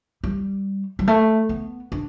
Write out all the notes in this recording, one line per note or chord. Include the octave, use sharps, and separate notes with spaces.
G3
G3
A3
B3
D4